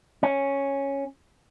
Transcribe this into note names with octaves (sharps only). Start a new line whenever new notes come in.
C#4